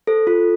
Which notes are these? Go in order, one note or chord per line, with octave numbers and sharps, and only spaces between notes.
A4 C5
F4 A4